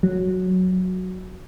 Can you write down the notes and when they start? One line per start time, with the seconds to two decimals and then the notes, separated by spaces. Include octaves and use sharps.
0.03 F#3